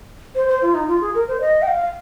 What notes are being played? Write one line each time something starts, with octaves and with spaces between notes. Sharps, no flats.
C5
C5
F4
D#4
F4
G#4
A#4
C5
D#5
G5
F5